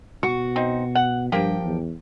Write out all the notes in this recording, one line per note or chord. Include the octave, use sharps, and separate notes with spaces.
B2 F#4 C#6
C4 D#4
F#5
G2 F3 A#3 G4 G5
E2